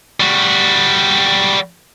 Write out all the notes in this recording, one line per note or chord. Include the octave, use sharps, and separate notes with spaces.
G3 F#4